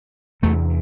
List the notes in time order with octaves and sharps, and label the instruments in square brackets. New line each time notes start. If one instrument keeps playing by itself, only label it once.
[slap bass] E2 C3 A3